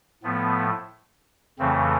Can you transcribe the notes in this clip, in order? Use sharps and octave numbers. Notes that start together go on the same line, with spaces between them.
A2 F3 A3 B3
F2 C#3 E3 A3 C4